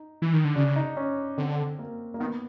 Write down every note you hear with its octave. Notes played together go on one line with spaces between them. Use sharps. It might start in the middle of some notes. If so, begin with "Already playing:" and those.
Already playing: D#4
E3
D#3
D3
C#3 D4
D#4
C#4
D3 C4
A#3
A#3
D#3 B3